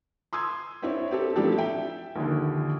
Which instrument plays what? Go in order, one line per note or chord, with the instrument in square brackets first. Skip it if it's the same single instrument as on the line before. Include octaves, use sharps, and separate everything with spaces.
[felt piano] C6 D#6 E6 G#6
C4 D4 E4 C#5 E5
C4 G4 A4
A2 F3 D4 G4 A4
E5 G5
A#1 D#2 D3